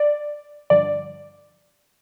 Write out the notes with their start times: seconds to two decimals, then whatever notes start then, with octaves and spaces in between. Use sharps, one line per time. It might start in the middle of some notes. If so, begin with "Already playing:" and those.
Already playing: D5
0.70 G2 D3 F3 D5